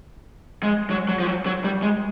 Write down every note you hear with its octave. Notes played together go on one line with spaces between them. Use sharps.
G#3
F#3
F#3
F3
F#3
F#3
G3
G#3